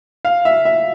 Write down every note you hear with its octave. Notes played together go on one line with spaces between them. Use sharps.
F5
E5
E5